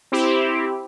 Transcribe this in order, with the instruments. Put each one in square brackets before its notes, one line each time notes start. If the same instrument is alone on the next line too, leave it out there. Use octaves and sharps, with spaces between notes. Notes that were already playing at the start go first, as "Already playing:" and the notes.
[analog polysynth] C4 E4 G4